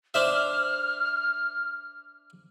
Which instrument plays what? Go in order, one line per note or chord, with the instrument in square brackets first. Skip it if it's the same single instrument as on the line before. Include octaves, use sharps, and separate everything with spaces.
[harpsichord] D4 C5 E5 [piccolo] F6